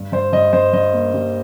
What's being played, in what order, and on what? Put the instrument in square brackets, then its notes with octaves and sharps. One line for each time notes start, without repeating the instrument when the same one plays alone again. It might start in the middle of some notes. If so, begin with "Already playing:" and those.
Already playing: [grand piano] G2
G2 C5
G2 D#5
G2 C5
G2 D#5
A#3
G3